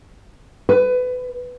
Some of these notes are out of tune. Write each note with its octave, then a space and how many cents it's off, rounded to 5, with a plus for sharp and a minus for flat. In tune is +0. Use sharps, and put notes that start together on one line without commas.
B4 +25